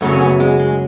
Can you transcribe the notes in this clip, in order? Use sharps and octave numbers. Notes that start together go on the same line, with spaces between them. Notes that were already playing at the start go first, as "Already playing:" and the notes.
F#2 C#3 F#3 A3
C#4
B3
G#3
G#3